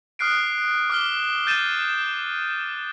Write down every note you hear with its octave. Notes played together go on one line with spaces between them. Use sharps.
D#6 F6 F#6 C7 D7
D6 F6 G7
G6 A6 D#7 E7